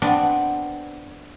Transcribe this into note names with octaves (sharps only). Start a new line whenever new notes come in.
B3 C4 D4 D5 B5